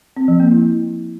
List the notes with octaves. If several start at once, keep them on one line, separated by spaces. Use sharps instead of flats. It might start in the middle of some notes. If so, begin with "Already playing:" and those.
C4
F3
A#3
E4